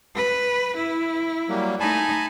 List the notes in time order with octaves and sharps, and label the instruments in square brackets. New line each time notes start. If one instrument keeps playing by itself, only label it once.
[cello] B4
E4
[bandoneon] F#3 G3 A#3
[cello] A3 D#4 [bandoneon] G#5 A5 B5